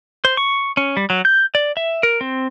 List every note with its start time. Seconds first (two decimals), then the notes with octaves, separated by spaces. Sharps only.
0.25 C5
0.37 C#6
0.77 C#4
0.97 G3
1.10 F#3
1.25 G6
1.55 D5
1.77 E5
2.03 A#4
2.21 C4